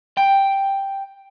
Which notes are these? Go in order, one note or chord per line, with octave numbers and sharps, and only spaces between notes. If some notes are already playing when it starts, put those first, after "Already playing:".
G5